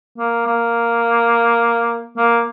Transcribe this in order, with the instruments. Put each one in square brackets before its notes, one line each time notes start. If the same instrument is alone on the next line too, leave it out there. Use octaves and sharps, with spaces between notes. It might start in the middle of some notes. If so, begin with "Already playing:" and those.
[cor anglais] A#3
A#3
A#3